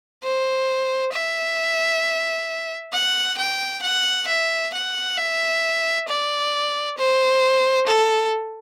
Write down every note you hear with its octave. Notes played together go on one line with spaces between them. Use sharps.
C5
E5
F#5
G5
F#5
E5
F#5
E5
D5
C5
A4